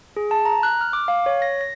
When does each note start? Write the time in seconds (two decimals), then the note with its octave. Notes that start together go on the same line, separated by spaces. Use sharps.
0.16 G#4
0.31 A5
0.45 A#5
0.63 F#6
0.81 F6
0.93 D6
1.08 F5
1.26 C#5
1.42 A#6
1.61 A#6